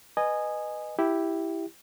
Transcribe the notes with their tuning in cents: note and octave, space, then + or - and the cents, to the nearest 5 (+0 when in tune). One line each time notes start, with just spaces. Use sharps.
B4 +0 D#5 -15 G#5 +0
E4 +0 G4 +0